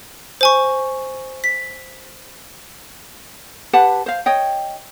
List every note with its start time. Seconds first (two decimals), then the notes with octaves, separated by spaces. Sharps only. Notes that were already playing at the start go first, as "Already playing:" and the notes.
0.41 C5 G#5 C#6
1.44 B6
3.73 G4 B4 F#5 A5
4.06 C5 F5
4.26 C#5 D#5 G5